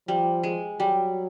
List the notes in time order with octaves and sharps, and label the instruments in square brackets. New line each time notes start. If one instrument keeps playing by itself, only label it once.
[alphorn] F3 [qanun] G3
[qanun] G#3
[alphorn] F#3 [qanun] G3